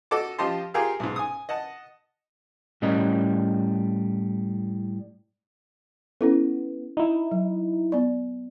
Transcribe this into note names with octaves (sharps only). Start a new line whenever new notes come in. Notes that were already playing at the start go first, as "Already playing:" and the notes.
F#4 A4 D#5 A5 D6
F3 F4 G4 D#5 A5 C6
F4 G4 G#4 A#4 F5
B1 G#2
G#5 D#6
D#5 F#5 A5
A2 G3 C#4 A#4 D#5
B3 C#4 E4 A4
D#4 E4
F#3
B3 D5